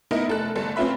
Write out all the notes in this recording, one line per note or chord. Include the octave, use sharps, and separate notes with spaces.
B3 D#4 E4 A#4
F1 A4 F#6
G1 A3 A4
C4 C#4 F4 B4 E5 B5